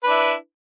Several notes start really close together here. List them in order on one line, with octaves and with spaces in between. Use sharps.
B4 D4 E4